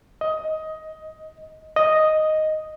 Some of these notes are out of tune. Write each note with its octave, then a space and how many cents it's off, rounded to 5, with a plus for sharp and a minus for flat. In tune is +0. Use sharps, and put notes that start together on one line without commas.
D#5 +15
D#5 +0